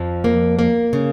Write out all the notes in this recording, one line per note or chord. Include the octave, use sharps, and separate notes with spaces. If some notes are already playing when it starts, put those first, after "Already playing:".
Already playing: F2 F3
A#3
A#3
C#3